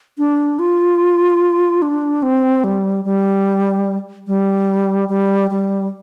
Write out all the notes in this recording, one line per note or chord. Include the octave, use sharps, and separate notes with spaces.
D4
F4
D4
C4
G3
G3
G3
G3
G3